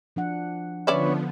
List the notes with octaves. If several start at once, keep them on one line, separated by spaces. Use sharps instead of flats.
F3 D4 F#5
D3 F3 B3 C#4 B4 C#5 D5 E5